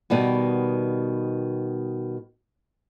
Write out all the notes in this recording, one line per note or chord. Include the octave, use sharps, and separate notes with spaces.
B2 D#3 G3 B3